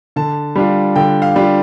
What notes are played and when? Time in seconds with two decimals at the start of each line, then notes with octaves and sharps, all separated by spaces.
0.16 D3 A5
0.55 G3 D4 F4
0.96 D3 G5
1.22 F5
1.36 G3 D4 F4